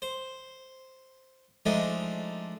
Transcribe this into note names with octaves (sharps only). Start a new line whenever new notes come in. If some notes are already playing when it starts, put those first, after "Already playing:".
C5
F3 G#3 A3 D4 D#4